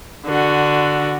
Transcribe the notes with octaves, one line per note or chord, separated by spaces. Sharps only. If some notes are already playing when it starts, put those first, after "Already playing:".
D3 F#4